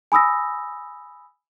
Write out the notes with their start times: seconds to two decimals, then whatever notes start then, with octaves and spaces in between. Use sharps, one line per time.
0.12 G#5 B5 D#6 E6 A#6